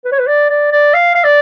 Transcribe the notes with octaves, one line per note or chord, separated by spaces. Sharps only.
B4
C#5
B4
D5
D5
D5
F5
F5
D5